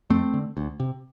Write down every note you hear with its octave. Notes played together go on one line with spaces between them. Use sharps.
F2 A3 C4
D3
D2
C3